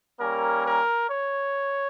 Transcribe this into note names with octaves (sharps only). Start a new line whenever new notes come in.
G3 A#3 C#4 A#4
A#4
C#5